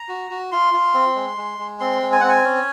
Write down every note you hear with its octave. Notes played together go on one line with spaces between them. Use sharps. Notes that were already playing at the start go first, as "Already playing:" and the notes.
Already playing: A#5
F#4
F#4
F4 C6
F4
C4
G#3
G#3
G#3
C4 C6
G#3
G#5
C4 F#5
G#5
C#4